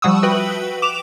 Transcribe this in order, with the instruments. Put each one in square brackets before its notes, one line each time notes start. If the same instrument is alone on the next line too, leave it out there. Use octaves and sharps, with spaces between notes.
[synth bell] F3 G3 F#5 C#6 D#6 E6
F#4 B4 E5 G5 F#7
D6 E7 F7